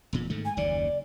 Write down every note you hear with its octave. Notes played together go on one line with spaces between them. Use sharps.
E1 A#2
G#2 D#3 A3
G#5
F#1 D#2 C#3 D5